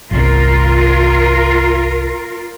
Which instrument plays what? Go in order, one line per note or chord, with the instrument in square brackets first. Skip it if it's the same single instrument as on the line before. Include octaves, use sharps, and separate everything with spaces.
[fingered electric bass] G1 C2 [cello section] F4 A#4